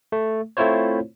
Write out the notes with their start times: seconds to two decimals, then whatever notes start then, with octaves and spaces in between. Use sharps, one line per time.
0.12 A3
0.57 A3 C4 E4 F4 C5 C#5